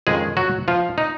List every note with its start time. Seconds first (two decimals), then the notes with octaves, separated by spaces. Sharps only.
0.07 F2 D#3 G#3 A#3 C#4 G#4
0.37 F#3 F#4
0.68 F3 F4
0.98 D#4